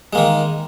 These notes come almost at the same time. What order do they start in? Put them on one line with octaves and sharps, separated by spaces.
G#3 A#3 D#3